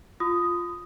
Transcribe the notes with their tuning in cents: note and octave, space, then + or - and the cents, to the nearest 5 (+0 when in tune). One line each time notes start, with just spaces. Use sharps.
F4 +0 B5 +45 D#6 +0